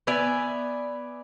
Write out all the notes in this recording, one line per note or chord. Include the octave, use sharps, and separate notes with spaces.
B3 D5 E5 G#5